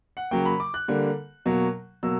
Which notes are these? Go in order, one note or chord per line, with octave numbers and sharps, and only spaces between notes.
F#5
C#3 F#3 A#3 G5
B5
D6
F#6
D3 G3 A#3
B2 F#3 A#3
B2 F#3 A#3 E6